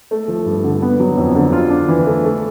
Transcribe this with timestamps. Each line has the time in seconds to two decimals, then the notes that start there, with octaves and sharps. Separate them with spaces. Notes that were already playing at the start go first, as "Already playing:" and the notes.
0.11 A3
0.28 F3
0.46 G2
0.64 D3
0.82 B3
1.00 F#3
1.18 F2
1.35 D3
1.53 F4
1.70 D4
1.88 E3
2.06 A3
2.24 A3